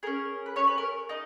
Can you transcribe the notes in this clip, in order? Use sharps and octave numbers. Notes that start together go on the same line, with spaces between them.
C#4 G#4 A#4
B4
C#4 C#5
B4
A#4
D#4 D#5